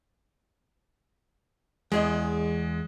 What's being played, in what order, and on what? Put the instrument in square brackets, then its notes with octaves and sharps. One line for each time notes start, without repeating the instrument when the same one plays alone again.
[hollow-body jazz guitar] E2 G#4 D#5 [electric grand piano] G#3